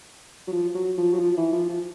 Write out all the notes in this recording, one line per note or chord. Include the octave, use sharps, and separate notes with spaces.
F#3
F3
F#3
F3
F#3
F3
E3
F3
F3